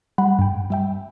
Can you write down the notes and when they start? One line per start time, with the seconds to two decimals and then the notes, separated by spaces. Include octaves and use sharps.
0.18 G3 F#5 B5
0.39 G2 G5
0.70 G3 E5 G5